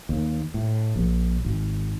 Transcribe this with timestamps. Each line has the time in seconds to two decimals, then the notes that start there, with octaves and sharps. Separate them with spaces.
0.09 D#2
0.54 A2
0.96 A#1
1.45 G#1